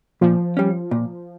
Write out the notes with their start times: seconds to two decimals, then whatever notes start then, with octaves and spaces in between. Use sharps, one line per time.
0.21 A#2 F3
0.57 G3 C#4
0.91 A#2